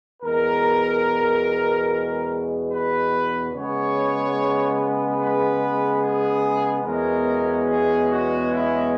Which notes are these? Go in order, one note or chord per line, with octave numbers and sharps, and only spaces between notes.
E2 B2 G#3 A#4
B4
C#3 G#3 B3 C#5
B4
G#4
E2 B2 G#3 C#4 A#4
G#4
F#4
E4